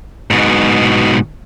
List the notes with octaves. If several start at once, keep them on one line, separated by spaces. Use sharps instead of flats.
G#2 B2